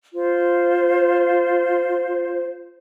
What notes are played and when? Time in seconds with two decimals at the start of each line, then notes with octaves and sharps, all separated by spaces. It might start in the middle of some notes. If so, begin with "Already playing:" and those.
0.14 F4 C5